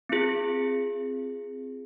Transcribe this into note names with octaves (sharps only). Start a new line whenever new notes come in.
C4 F4 G#4